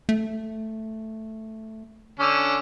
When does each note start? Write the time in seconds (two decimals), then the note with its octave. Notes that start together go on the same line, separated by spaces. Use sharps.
0.09 A3
2.19 D3 C#4